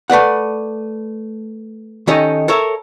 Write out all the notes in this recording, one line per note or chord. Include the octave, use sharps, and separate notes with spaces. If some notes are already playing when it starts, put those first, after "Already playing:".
A3 B4 D5 F#5
D#3 C#4 D#4 G4 A4 D#5
A4 A#4 C#5 E5